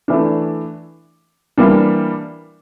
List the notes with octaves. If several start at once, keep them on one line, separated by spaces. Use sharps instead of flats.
E3 A3 D4
E3 G3 A#3 D4